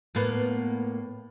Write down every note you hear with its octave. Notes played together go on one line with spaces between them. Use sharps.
A2 A#3 B3